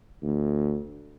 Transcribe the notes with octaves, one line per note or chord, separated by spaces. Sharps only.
D2